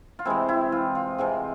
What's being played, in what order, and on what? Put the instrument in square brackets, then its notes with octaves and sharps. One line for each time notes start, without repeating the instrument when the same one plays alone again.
[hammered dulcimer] F4
C3 E3 G#3 C4 E4
E4
F4
F4
C3 E3 G#3 C4 F4